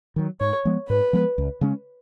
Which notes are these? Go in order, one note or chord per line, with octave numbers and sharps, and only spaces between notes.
D#3 F#3
G#2 C#5
F3 G#3 B3
G#2 B4
F3 G#3 B3
C#2
C#3 G#3 C#4